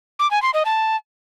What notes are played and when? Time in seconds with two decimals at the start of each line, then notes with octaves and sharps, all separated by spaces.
0.19 D6
0.31 G#5
0.42 C6
0.54 D#5
0.65 A5